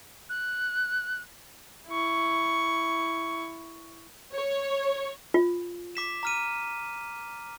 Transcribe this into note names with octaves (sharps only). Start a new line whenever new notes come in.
F#6
E4 C#6
C#5
F4
D6 B6 E7
A#5 F6 D#7